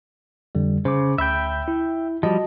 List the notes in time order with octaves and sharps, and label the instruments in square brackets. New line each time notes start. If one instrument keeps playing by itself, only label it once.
[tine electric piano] F2 D3 G3
[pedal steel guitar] C#3 [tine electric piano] C5 D6
[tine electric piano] D2 B5 G6 [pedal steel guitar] E5 G5
[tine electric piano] E4
[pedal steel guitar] F3 G3 [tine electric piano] F#4 D#5 A5